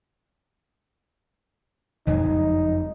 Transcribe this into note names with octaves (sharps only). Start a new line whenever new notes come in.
F#1 F2 G#3 D#4